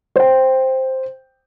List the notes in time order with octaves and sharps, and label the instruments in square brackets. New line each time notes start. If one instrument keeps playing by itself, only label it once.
[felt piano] C5 G5